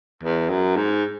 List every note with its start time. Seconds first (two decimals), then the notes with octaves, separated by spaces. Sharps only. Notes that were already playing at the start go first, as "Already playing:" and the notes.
0.23 E2
0.49 F#2
0.76 G#2